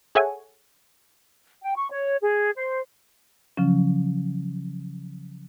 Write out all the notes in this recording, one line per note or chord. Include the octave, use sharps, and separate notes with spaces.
G#4 A4 C#5 E5 F#5 G#5
G5
C#6
C#5
G#4
C5
C#3 F3 F#3 C#4